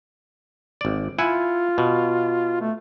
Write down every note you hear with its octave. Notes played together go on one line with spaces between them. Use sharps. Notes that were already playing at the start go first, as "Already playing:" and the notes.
G#1 D5
E4 F4 F#5 G#5
B2
A3